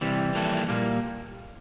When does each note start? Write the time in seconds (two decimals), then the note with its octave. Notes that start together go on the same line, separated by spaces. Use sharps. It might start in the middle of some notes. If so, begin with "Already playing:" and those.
0.01 C3 E3 G3
0.35 F3 A#3 E4 A4
0.68 A#2 G3 A#3